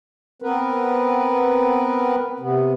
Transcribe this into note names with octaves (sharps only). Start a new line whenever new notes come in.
B3 C4 A#4 B4
C3 B3